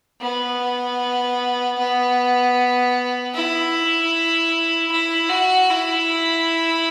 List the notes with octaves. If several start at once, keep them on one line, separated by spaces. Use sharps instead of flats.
B3
B3
E4
E4
F#4
E4